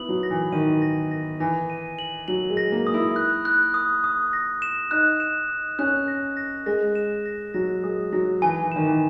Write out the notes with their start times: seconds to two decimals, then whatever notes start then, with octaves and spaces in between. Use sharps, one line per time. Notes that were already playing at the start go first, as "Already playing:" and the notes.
Already playing: B3 E4 D#6 F#7
0.09 F#3
0.23 A#6
0.30 E3
0.52 D#3 D#7
0.82 A#6
1.11 A#6
1.40 E3 A#6
1.70 D#7
1.99 F#7
2.28 F#3 F#7
2.50 G#3
2.57 A#6
2.72 A#3
2.87 D#6
2.94 E4
3.16 F#6
3.45 F#6
3.74 D#6
4.04 D#6
4.33 A#6
4.62 E7
4.91 D#4 F#6
5.20 E7
5.49 D#6
5.79 C#4 F#6
6.08 A#6
6.37 A#6
6.66 G#3 A#6
6.95 E7
7.26 A#6
7.54 F#3 A#6
7.83 G#3 D#6
8.13 F#3 A#6
8.42 E3 G#5
8.63 E3
8.72 D#3 E7
8.86 E3